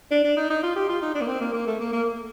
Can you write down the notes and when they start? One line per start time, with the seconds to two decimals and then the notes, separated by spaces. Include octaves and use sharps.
0.11 D4
0.24 D4
0.37 D#4
0.50 D#4
0.63 F4
0.76 G4
0.89 F4
1.02 D#4
1.15 D4
1.21 A#3
1.28 C4
1.41 A#3
1.54 A#3
1.67 A3
1.80 A#3
1.93 A#3